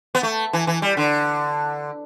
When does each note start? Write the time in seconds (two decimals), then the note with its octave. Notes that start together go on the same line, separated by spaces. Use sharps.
0.15 B3
0.23 A3
0.53 E3
0.67 E3
0.82 G3
0.97 D3